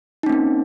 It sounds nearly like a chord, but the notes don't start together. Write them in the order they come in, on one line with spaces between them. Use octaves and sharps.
D#4 C#4 A#3 C4